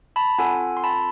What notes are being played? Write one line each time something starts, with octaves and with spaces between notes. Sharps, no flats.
A5 B5
C4 F4 A4 F#5 G#5
C6
A5 B5